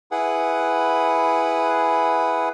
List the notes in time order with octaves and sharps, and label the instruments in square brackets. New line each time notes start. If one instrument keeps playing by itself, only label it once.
[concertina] E4 G#4 B4 F#5